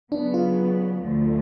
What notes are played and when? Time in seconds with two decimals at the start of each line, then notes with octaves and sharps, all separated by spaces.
0.11 C#3 F#3 B3 D4
0.34 F4
1.01 D2 D3 F3 A3